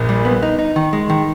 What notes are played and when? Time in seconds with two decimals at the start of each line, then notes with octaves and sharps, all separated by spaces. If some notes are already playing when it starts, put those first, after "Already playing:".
Already playing: A#1 A#2
0.09 G3
0.25 B3
0.43 D#4
0.59 D#4
0.76 D#3
0.93 G#3
1.10 D#3